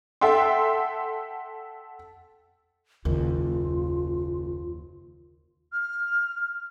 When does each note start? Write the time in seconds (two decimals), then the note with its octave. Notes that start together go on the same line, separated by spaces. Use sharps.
0.21 A4 E5 F#5 G5 C6
3.05 F#1 D#2 F4
5.71 F6